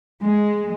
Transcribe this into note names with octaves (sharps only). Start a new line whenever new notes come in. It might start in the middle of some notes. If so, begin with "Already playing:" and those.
G#3